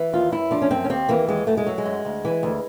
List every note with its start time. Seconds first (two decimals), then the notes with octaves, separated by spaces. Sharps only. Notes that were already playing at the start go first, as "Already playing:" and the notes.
Already playing: E3
0.13 D#2 F4
0.32 F#2 E4
0.51 F3 D4
0.62 C#4
0.70 F#2 C4
0.84 C#4
0.90 D#2 C4
1.09 E3 A#3
1.28 D#2 G#3
1.47 F#2 A3
1.57 G#3
1.67 F#3
1.78 G#3
1.86 F#2
2.05 D2
2.25 E3
2.43 D2